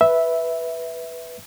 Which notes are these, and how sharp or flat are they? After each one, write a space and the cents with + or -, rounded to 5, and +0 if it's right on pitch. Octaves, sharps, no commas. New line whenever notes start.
B4 +0 E5 -5